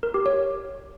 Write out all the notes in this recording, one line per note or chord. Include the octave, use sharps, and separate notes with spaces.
A#4
G4
C#5